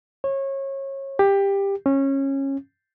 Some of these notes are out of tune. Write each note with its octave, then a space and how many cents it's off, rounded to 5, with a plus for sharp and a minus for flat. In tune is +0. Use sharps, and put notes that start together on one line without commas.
C#5 -25
G4 +15
C#4 -20